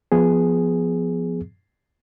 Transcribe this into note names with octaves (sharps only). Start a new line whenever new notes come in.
F3 B3 G#4